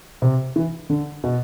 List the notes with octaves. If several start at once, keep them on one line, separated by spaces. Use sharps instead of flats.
C3
E3
D3
B2